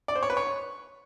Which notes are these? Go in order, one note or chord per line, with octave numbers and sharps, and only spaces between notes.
D5
C5
C#5
B4
C#5